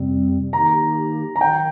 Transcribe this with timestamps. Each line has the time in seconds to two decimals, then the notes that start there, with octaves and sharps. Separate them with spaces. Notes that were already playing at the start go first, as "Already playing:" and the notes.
Already playing: F2 C3 G3 C4
0.53 D#3 A#3 D#4 G4 A#5
1.36 A#5
1.41 D#3 G5